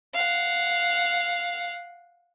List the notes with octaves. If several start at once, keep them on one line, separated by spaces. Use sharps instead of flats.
F5 F#5